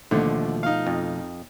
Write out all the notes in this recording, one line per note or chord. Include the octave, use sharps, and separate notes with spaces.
D#2 B2 D3 F3 A3
D#4 F5
F2